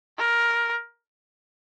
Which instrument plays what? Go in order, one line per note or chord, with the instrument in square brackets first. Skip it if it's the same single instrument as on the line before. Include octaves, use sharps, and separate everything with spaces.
[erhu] A#4